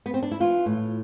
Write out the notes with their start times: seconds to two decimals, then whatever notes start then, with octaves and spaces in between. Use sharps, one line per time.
0.06 B3
0.14 C4
0.23 D4
0.31 E4
0.40 E3 F4
0.66 A2